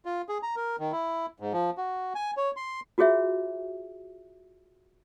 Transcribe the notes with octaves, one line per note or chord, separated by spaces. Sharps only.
F4
G#4
A#5
A#4
D#3
E4
G#2
F3
F#4
G#5
C#5
C6
F4 F#4 G#4 C#5 E5